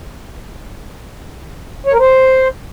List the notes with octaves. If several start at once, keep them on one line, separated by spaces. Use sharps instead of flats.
C#5
A#4
C5